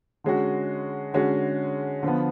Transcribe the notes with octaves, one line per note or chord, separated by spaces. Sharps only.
D3 G#3 C#4 F#4
D3 G#3 C#4 F#4
D3 F3 B3